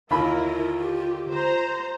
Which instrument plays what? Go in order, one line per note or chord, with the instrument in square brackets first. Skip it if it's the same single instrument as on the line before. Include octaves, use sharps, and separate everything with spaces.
[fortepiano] D#2 B5 [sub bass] D3 [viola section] E4 A#4 [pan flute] F4
[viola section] G4
C5 A#5